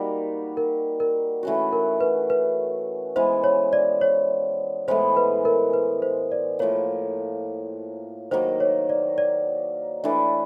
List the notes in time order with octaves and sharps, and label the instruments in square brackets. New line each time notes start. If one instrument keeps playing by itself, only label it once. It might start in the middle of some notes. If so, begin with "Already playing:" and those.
Already playing: [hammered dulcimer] G3 A#3 D#4 F#4 [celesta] A#4
[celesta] A#4
A#4
[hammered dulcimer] E3 A3 C#4 F#4
[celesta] A#4
B4
B4
[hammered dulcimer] E3 G#3 B3 [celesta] C5
[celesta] C#5
D5
C#5
[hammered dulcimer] A2 E3 G#3 B3 [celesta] C5
[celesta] B4
A#4
B4
C5
D5
[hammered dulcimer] A2 F3 A#3 [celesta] C#5
[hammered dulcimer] D#3 F#3 A#3 D#4 [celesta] C5
[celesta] C#5
D5
D5
[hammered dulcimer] E3 A3 D4